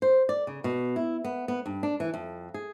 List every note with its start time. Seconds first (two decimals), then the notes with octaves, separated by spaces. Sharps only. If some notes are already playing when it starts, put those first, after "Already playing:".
0.02 C5
0.29 D5
0.47 C#3
0.64 B2
0.96 E4
1.24 B3
1.48 B3
1.66 G2
1.83 D4
2.00 E3
2.14 F2
2.54 G#4